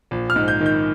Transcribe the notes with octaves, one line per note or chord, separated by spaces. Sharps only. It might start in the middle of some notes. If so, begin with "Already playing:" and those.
A#1
F6
G#2
G6
D#3
G6